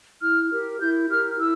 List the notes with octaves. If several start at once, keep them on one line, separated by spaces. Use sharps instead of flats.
E4 F6
G4 A#4
E4 G6
G4 A#4 F6
E4 E6